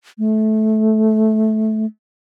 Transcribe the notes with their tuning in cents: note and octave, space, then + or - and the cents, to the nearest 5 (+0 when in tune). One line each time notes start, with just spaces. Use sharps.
A3 -15